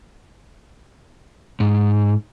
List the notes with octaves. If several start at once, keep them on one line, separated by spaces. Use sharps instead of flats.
G#2